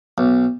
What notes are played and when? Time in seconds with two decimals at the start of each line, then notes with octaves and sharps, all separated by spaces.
0.18 B1